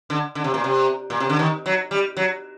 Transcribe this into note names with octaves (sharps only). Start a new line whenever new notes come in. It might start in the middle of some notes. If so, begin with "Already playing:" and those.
D3
D3
C3
A#2
C3
A#2
C3
D3
D#3
F#3
G3
F#3